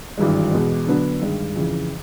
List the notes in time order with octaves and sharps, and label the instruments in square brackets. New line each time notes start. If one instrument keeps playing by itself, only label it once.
[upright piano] G#1 G2 E3 G#3
E2 B2 G#3
D3 F#3 B3 D4
G2 D#3 G#3
F2 C#3 E3